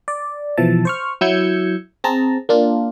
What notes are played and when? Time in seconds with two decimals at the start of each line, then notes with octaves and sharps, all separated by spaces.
0.08 D5
0.57 B2 E3 F3 E5 A5
0.85 C5 C#6 F6
1.21 F#3 E4 E6 G6 G#6 C#7
2.04 C4 G#4 A5 A#5
2.49 A#3 D4 F4